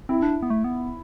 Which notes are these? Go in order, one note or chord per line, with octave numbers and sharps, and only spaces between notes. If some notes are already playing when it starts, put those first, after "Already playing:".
C4 E4
D4
B3
A3
B3